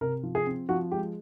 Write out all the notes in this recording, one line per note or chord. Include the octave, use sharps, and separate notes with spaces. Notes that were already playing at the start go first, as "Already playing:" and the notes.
C3 A#4
F3
G#4
C4
F3 F#4
G#3 G4